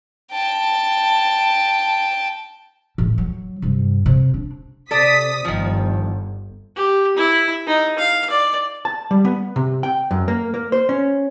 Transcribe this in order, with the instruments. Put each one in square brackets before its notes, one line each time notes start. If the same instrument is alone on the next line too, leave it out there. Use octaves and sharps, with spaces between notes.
[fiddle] G5 A5
[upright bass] A1
F#3
G2 C3
C3
D4
[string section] C3 D#6 B6 [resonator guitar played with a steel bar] A4 D5
[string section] G1 [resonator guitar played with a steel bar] D#3 F3
[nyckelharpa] G4
E4
D#4
F5
D5
[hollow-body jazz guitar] A5
G3
B3
C3
G5
F#2
A#3
A#3
C5
C#4